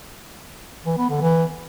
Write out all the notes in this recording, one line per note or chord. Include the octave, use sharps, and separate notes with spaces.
E3
B3
D3
E3